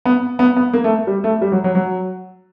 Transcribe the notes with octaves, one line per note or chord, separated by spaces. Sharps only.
B3
B3
B3
A#3
A3
G3
A3
G3
F#3
F#3
F#3